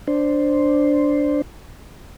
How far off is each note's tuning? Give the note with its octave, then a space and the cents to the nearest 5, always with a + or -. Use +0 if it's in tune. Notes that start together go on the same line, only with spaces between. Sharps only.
D4 +0 C5 +0